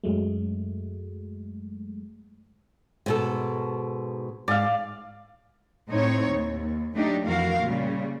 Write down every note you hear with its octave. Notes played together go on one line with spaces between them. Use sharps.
F#2 F#3 G#3 A3
G#2 B2 A4
G#2 D5 F5
A2 C4 D#4 C#5
D#2
F#3 A3 D4 D#4 G4
F2 E3 F#4 A#4 F5
A#2 C#3 G3